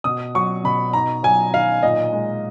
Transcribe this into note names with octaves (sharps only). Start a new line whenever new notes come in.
B2 D#6
F#3 C#6
B2 B5
D#4 A#5
F#3 G#5
D#3 F5
A#2 D#5
G#3